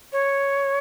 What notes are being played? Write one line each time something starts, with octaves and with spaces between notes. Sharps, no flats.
C#5